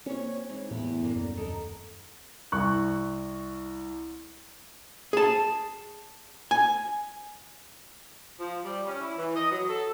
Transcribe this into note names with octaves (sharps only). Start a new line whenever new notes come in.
A#2 C4 C#4 C#5
G#2 E3
E2 A2 G4 B4
F#2 D3 A#3
D#1 F#2
F1 A4 A#4 D#5
C2 C#6 F#6
G#4 A5
G#5
F3
G3
C#4
E4
E3
D#5
F#3
A4